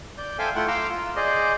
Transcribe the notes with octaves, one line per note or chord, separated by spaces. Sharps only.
D5 G6
A4 C5 E5 F5 G5 G#5
A3 E4 F4 F#5 G5
F5 A#5 C6 D6 E6
F4
G#4 C5 D5 D#5